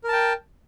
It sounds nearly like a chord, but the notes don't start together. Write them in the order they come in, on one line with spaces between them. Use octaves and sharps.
A#4 A5 G5